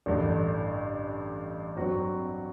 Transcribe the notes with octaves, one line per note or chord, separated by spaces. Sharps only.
A1 G2 D3
G2 F#3 C4 F#4